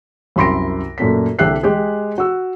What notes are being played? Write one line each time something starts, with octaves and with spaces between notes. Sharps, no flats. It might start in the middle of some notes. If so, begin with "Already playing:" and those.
C2 F#2 B5 C6 A#6 D7
F#2 A#2 A3 B6
C2 D3 G4 E5 F#6 C7
G#3 G4 G#4
F#4 E6